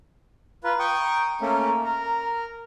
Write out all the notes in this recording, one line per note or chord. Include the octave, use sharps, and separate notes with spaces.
F4 B4 A#5
G5 C#6 D#6
A3 A#3 C#4
A#4